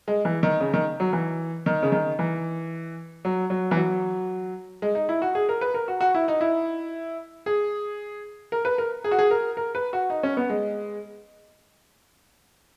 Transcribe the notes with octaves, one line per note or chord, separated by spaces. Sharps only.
G#3
E3
D#3
C#3
D#3
F#3
E3
D#3
C#3
D#3
E3
F#3
F#3
E3
F#3
G#3
D#4
E4
F#4
G#4
A#4
B4
A#4
F#4
F#4
E4
D#4
E4
G#4
A#4
B4
A#4
G#4
F#4
G#4
A#4
A#4
B4
F#4
D#4
C#4
B3
G#3